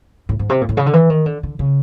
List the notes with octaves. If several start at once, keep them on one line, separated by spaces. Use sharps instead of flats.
A2
G#2
C3
A#2
A2
C#3
D3
E3
D#3
D3
D3
C#3